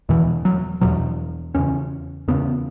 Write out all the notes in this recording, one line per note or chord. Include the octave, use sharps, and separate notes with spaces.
E2 B2 E3
F#3
E2 B2 F#3
E2 C#3 C#4
E2 C#3 B3